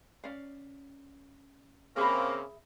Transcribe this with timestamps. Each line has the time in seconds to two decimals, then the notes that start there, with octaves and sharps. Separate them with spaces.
0.24 C#4 D5 F5
1.97 C#3 A#3 C4 G#4 E5 B5